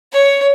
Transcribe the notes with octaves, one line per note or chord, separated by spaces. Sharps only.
C#5